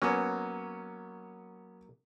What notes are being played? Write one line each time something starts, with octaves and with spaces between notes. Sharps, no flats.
F#3 A#3 B3 C#4